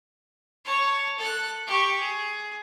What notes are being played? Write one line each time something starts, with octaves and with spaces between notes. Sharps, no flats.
C#5 A5
A4 F#6
G4 C#6
G#4